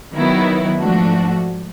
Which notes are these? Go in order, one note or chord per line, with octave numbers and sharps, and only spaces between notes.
D#3 F#3 B3 E4
G#2 F3 A3 D4 F#4